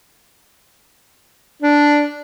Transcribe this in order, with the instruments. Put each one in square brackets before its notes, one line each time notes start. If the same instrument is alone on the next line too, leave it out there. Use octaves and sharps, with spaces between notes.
[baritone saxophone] D4